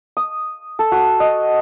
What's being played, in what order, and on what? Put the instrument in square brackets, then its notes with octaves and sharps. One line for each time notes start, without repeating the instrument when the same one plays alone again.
[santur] D#6
A4
F#4
D#5